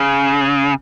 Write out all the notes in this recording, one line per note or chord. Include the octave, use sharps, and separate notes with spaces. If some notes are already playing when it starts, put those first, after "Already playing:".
Already playing: C#3